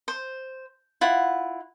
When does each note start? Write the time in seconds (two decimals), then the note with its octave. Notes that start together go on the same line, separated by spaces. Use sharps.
0.08 C5
1.01 E4 F4 F#5